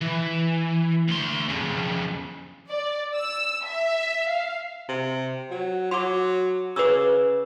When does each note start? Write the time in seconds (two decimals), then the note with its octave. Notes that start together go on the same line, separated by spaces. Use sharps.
0.01 E3
1.08 D2 C6
1.48 F2 C#3
2.69 D5
3.16 E6
3.65 E5
4.29 F5
4.89 C3
5.51 F#3
5.91 F#3 C6 D6
6.76 C#3 B4 D6 E6